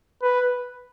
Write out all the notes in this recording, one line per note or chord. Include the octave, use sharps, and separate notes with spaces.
B4